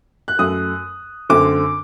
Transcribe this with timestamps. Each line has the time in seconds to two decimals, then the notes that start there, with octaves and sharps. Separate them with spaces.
0.28 F#6
0.39 F#2 F#3 A3 D#6
1.29 F#2 D3 A3 C4 D6